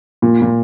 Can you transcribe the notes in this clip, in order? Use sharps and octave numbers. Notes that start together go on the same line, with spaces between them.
A#2
A#2